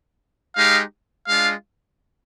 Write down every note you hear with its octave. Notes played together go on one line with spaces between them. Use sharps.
G#3 D#4 G4 F5
G#3 D4 F4 F5